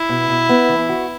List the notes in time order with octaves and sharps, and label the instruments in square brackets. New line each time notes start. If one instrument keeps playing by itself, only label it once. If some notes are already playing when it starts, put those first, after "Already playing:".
Already playing: [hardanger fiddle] E4
[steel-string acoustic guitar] B2
B2
B3
E3
F#4